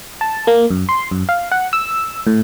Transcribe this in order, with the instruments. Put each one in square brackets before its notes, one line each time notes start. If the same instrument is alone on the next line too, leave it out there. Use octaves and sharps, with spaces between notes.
[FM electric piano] A5
A#3
F#2
C6
F#2
F5
F#5
E6
A2